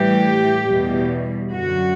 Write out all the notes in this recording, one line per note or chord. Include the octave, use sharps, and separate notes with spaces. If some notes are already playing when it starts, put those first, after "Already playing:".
Already playing: A2 E3 G3 G4
E2 B2 G3
F#2 D3 F#3 F#4